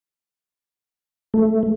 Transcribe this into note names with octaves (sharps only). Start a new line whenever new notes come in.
A3